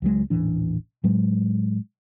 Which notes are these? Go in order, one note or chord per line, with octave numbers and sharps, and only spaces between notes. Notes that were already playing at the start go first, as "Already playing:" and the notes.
C#2 F#3 G#3
D#1 A1 E3 D4
A2 F#3 G#3